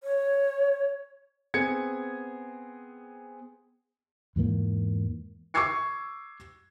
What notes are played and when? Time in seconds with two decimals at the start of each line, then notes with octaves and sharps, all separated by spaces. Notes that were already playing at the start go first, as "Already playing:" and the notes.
0.03 C#5
1.54 B3 C4 G#4 G#6 C#7
4.36 E2 G#2 E3 A#3
5.54 C#6 D6 E6 G#6 C7 C#7